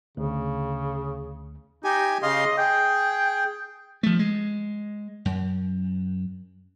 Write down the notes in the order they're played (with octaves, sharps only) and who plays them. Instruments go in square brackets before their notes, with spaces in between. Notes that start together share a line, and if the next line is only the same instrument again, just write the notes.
[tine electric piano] D2 [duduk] C#3
[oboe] D#4 [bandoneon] G4 G#5
[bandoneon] C#3 F5 C6 [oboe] D#5
[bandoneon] G#4 [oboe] G5
[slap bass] F3 A3
G#3
F#2